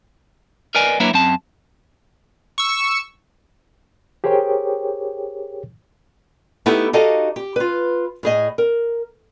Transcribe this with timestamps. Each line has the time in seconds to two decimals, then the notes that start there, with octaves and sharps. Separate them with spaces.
0.75 A#4 B4 D5 D#5 G#5
1.00 F#3 A#3 D4 E4 B4 C#5
1.14 F#2 C4 A5
2.58 C#6 E6
4.24 G4 G#4 A#4 C5 C#5 G5
6.66 A3 B3 D#4 E4 G4 A4
6.93 D#4 F#4 G4 A4 D#5 F5
7.36 G4
7.56 F4 B4
8.23 A2 G#4 D#5
8.58 A#4